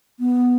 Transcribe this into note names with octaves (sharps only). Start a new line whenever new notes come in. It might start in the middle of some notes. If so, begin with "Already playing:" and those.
B3